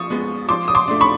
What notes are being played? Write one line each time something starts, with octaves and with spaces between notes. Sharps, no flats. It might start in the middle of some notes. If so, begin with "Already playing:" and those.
Already playing: F3 C#6 D#6
G#3 B3
F3 C6 D6
D#6
C6 D6
A3 D4
B5 C#6